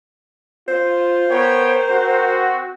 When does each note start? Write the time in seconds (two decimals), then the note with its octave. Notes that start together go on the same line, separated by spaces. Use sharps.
0.68 F4 C5
1.30 B3 A#4 C#5 G5
1.90 C4 F#4